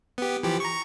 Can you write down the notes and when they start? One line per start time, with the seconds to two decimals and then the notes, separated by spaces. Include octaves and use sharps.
0.18 B3 G4
0.43 E3 F3 G4
0.60 A#5 C#6